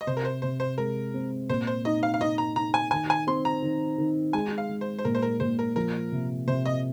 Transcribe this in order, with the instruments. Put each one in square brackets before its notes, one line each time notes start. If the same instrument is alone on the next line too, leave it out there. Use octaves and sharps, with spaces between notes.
[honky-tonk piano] D#5
[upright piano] C3 [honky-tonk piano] C5
[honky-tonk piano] A#4
C5
[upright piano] C3 [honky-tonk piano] C5
[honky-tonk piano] C5
[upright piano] G#3 [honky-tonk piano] A#4
[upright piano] C4
[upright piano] A#2 [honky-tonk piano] C5
[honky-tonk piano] C5
[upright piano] D#4 [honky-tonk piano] D#5
[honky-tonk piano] F5
F5
[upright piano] D#4 [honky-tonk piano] D#5
[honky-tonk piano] A#5
[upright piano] D#4 [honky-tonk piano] A#5
[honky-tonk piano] G#5
[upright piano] D#3 [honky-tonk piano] G#5
[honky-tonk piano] G#5
[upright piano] C4 [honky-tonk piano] C6
[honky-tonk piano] A#5
[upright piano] D#3
D#3
[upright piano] G#3 [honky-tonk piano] G#5
[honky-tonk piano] F5
[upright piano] G#3
[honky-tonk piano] C5
C5
[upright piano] A#2 [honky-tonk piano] A#4
[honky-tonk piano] C5
A#4
[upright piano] A#2 [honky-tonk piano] C5
[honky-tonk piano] A#4
[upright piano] F3 [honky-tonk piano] A#4
[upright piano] C3
[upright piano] C3 [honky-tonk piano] C5
[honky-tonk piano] D#5